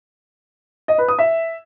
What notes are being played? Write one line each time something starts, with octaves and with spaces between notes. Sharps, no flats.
D#5
B4
D#6
E5